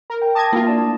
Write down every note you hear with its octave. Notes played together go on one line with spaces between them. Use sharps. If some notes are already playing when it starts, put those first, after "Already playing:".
A#4
G5
A5 D6 D#6 G#6 A#6
A#3 E4 F4
D4 D5 A5
A3